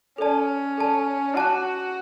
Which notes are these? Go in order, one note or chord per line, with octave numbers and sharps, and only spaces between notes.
C#4 A4 D5 A5
A4 D5 A5
F#4 F#5 A5 D6 F#6